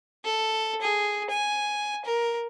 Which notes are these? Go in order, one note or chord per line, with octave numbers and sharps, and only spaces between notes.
A4
G#4
G#5
A#4